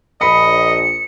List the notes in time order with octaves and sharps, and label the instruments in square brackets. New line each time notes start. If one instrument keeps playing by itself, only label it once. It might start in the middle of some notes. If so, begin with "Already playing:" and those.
[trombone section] A#1 [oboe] D#5 [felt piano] B5 D#6 [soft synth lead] C#7